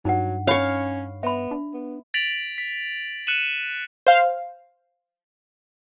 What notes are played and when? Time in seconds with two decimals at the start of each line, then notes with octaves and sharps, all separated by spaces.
0.05 G2 F#3 D#4 F#5
0.47 C#4 C#5 F5 B5 C#6
1.23 B3 E5 B5
1.51 D4
1.73 B3
2.14 A6 B6 D7 F7 F#7
2.58 B6
3.27 F#6 C#7 D#7 E7 F#7
4.07 C5 F5